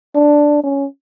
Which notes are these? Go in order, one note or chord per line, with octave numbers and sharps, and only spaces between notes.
D4
C#4